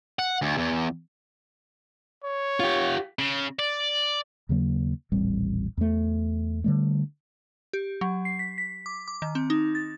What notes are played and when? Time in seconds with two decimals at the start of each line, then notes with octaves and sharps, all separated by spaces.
0.19 F#5
0.42 D2
0.57 E2
2.24 C#5
2.60 F4 G4
3.19 C#3
3.59 D5
4.49 D#2 C#3 F#3 A#3
5.12 D#1 A1 G3 C4
5.77 E2 A3
6.64 D3 G3 A3
7.73 G4
8.01 F#3
8.25 C7
8.39 B6
8.58 B6
8.86 D6
9.08 D6
9.22 D#3
9.35 C4
9.50 D#4
9.75 A6